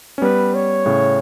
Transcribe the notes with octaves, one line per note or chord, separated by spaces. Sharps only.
C#4
G3 B3 B4
C#5
A2 C#3